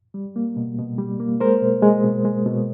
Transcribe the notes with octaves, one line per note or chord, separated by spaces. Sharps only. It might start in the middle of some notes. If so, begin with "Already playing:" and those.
G3
A#3
B2
B2
G3
A#3
G#3 A#4 C5
B2
G#3
B2
G#3
B2